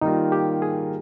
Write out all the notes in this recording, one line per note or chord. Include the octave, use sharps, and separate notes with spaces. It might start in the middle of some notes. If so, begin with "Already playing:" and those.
D#3 G3 A#3 D#4 F4
G4
G#4